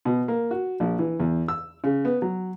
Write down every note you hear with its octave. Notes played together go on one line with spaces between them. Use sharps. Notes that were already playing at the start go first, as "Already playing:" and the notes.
B2
A#3
F#4
A#1
E3
E2
E6
C#3
B3
F#3